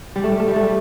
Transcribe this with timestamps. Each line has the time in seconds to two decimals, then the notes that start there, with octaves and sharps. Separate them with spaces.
0.16 G3
0.24 A3
0.32 G3
0.40 A3
0.48 G3
0.56 A3
0.64 G3